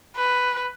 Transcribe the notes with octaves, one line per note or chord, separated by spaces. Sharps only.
B4